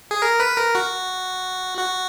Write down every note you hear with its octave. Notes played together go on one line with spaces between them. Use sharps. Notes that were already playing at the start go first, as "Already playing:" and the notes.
G#4
A#4
B4
A#4
F#4
F#4